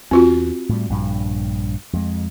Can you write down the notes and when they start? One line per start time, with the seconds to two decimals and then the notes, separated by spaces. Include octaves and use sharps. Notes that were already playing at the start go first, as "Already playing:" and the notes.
0.11 E2 C4 F4 F#4
0.69 A2 G3
0.90 A#1 G2
1.93 F2 G#3